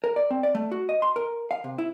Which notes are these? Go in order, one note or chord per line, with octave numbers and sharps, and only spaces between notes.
A#4
D5
C4
D5
A3
F#4
D#5
C6
A#4
F5
C3
E4